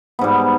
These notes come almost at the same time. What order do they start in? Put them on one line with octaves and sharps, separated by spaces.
B3 G#2 G3